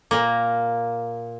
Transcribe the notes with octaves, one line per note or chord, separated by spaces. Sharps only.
A#2 A#3